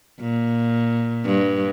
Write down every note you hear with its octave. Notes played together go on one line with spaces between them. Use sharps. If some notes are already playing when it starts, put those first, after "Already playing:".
A#2
G2